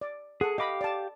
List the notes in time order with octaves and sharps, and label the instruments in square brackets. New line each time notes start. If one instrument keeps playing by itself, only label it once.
[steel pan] D5
[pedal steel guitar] G#4 [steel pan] A4 F#5
[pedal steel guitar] G4 F5 D6 [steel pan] D#5 B5
[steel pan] D5 A5